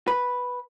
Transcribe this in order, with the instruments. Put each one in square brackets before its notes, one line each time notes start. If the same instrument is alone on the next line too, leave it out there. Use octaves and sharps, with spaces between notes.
[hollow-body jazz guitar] B4